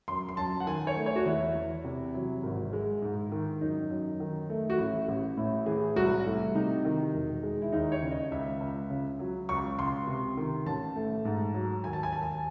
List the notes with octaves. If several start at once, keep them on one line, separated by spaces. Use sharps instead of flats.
F#2 C6
C6
F#2 A5
F#5
D#3 G#5
C#5
A3
C#5
F#4
E2 E4
E2
C3
F#3
G#1
G#3
G#2
D#3
F#2 D#4
F#2
D#3
A3
F#4
A1 E4
A1
A2 E4
E3 G#4
C2 F#4
A3 E4
C3 D#4
D#3
E1
G#3
E4
D#2 D#4
C#5
C#3
D#5
C#2 E5
C#2
C#3
F#3
C#2 C#6
C#2 C6
C3
D#3
A1 A5
A3
G#2
F#3
D#2 G#5
A5
G#5
D#2 A5
G#5